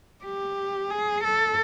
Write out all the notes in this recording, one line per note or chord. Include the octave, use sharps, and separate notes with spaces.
G4
G#4
A4